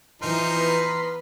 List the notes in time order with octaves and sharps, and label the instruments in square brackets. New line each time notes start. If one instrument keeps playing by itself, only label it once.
[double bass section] E3 [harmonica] F3 D#4 [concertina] A#5 C6 F6
[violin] B3 B4